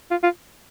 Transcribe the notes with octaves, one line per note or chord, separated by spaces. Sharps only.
F4
F4